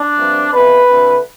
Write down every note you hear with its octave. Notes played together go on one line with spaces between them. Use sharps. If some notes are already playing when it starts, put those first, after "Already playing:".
Already playing: D4
G2 F3 A3 C4
F2 C3 E3 B3 B4
D2 D3 A3 C4